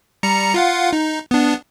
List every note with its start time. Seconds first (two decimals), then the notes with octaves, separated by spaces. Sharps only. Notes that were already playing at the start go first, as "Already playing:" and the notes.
0.23 G3 A#5 C#7
0.54 F4 F5 F#5
0.93 D#4
1.31 B3 D4